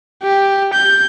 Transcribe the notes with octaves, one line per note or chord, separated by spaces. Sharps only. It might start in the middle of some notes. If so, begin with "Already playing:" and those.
G4
G6